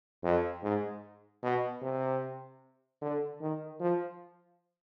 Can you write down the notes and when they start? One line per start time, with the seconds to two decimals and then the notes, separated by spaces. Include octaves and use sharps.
0.23 F2
0.63 G#2
1.43 B2
1.82 C3
3.01 D3
3.41 D#3
3.80 F3